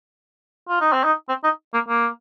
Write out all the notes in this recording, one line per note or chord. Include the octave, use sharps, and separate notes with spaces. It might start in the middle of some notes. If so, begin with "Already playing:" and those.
F4
D#4
C4
D#4
C4
D#4
A#3
A#3